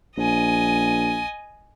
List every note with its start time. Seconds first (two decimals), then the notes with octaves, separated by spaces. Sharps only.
0.17 A#1 D#5 G#5